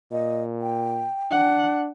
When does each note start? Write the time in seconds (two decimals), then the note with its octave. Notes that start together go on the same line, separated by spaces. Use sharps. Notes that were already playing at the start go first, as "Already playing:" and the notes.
0.12 A#2 D#5
0.62 G5
1.31 D4 F#5